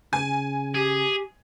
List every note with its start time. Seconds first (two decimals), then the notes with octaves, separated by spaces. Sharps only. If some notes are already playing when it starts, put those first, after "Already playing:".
0.13 C#3 G#5
0.75 G4 G#4